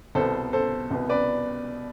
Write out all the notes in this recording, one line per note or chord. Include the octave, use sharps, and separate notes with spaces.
C2 B2 B3 A4 C5
A4 C5
C2 B2 B3
B4 D5